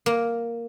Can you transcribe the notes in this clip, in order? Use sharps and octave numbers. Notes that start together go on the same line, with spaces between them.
A#3